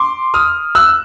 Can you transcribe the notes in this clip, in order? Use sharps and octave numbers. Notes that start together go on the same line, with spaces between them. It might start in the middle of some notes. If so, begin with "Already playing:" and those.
Already playing: C6 D6
D#6 F6
E6 F#6